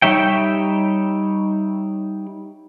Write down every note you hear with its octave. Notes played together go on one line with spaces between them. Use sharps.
G3 D#4 C#5 E5 G5